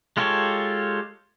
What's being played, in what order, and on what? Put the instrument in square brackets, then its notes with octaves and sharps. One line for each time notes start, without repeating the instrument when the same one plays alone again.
[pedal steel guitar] G#3 F4 G4 A4 C#5